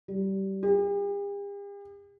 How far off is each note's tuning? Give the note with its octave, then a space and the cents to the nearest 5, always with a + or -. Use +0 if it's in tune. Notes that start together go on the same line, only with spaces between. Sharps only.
G3 -20
G4 +45